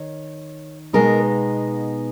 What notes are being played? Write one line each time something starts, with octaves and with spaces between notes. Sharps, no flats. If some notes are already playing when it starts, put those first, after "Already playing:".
Already playing: D#3 C#5
B2 G#3 B3 D#4 A#4